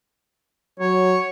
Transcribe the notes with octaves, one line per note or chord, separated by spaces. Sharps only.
F#3 C#5